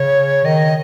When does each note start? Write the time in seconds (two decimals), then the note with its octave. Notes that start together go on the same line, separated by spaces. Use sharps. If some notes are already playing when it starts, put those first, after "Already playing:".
Already playing: C#3 C#5
0.45 D#3 D#5